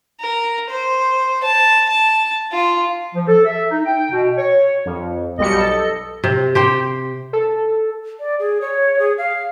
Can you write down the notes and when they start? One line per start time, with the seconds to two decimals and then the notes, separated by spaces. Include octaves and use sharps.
0.20 A#4
0.70 C5
1.44 A5
1.90 A5
2.52 F4
3.15 F3
3.28 A4
3.45 E5
3.71 D#4
3.85 G5
4.12 B2
4.38 C#5
4.85 F2
5.38 B1 G3 D#5 C#7
5.57 A4
6.24 C3
6.55 G4 C5 G5
7.33 A4
8.20 D5
8.39 G#4
8.61 C#5
8.99 G#4
9.18 F5